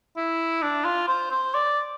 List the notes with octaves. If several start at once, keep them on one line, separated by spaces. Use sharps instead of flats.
E4
D4
F4
C5
C5
D5